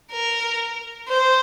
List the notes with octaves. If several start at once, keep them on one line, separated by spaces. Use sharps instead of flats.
A#4
C5